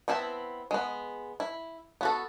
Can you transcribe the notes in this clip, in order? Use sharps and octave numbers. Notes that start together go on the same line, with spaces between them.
B3 C4 E4 A5
G#3 B3
E4
B3 F#4 A4